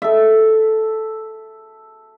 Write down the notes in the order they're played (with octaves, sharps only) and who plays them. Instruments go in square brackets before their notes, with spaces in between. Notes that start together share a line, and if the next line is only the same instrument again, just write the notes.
[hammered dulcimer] A4 E5